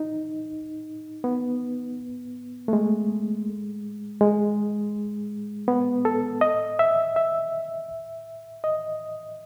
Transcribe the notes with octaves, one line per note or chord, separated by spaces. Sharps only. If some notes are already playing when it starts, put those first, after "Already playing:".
Already playing: D#4
B3
A3
G#3
G#3
B3
A4
D#5
E5
E5
D#5